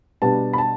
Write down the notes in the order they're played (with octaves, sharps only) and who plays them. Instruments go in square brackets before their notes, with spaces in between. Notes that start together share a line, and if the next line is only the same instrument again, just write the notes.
[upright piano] B2 G3 B3 D4 A5
B5
A5